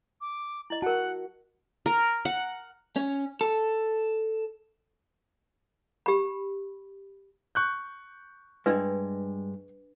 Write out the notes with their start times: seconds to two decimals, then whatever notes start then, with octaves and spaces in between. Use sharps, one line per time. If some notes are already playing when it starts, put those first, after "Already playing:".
0.21 D6
0.70 E4 D#5 F#7
0.82 F#4 A#4 F#5 A5
1.86 A#4
2.25 F#5
2.96 C#4
3.41 A4
6.06 G4 B5
7.55 C#6 F#6 G6
8.66 G2 G#3 D4 B4